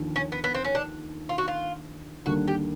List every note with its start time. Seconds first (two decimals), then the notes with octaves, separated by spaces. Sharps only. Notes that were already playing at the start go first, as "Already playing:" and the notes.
Already playing: D#2 D3 F3
0.16 C#4
0.32 B3
0.44 B3
0.55 C4
0.64 C#4
0.75 D4
1.29 F4
1.38 F#4
1.48 F4
2.26 D#2 D3 G3 A#3 F#4
2.48 G4